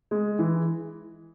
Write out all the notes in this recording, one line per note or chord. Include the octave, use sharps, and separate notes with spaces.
G#3
E3